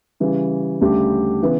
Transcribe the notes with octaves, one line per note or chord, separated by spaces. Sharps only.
C#3 E3 G3
D2 C#3 G3 D4 G4
C#3 E3 B3